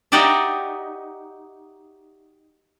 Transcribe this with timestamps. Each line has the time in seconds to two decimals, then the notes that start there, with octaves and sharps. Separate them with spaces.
0.12 D#4 F#4 G4 D5 E5